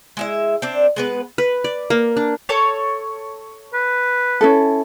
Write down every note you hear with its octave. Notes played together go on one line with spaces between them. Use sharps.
G#3 E4 E5
C4 D4
G#3 B3 B4
B4
D5
A#3
D4
A4 C#5
B4
C#4 E4 A4